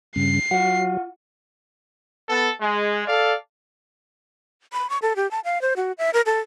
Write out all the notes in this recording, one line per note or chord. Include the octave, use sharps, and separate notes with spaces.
G2 C#3 C7
F#3 F4 F#5
B3 A4
G#3
A4 D5 F5
B5
C#6
A4
G4
A5
F5
C5
F#4
E5
A#4
A4